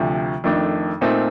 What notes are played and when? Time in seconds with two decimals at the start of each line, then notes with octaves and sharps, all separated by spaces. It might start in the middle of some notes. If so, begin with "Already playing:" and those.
Already playing: D2 C3 F3
0.44 F2 D#3 A3 D4
1.01 A#2 A3 C4 D#4